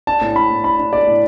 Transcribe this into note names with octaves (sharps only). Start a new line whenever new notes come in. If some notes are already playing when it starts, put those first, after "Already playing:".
D4 A5
A2
D4 B5
A2
D4 B5
D4
A3 D5
A2